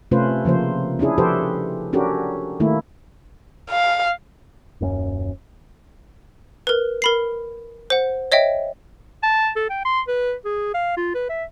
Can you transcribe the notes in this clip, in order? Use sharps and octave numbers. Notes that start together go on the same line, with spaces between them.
C3 A3 C#4 F4 B4 C5
C#3 F3 A#3 C5
C#4 D4 E4 G#4
F3 G4 A4 B4 C5
C#4 D4 F#4 G4 A4 A#4
D#3 A3 A#3 E4
F5
D#1 F#2 G3 C#4
A#4 B4
A#4 B5 C7
C5 F#5
C#5 D#5 E5 G5
A5
A4
G5
C6
B4
G#4
F5
F4
B4
E5